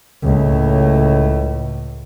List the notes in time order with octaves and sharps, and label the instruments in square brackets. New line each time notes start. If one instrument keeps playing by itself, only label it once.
[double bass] C#2 A2